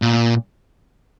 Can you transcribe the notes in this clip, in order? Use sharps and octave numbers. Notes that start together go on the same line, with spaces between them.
A#2